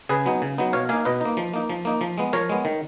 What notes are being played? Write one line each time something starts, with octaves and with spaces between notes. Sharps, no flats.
C#3 G#4 B4
F#3 B3 D#4
C#3
F#3 B3 D#4
B2 C#5 F5
A#3 D#4 F5 G#5
B2 B4 D#5
A#3 D#4
F3
A#3 D#4
F3
A#3 D#4
F3
G#3 B3
F3 A#4 C#5
G#3 B3
D#3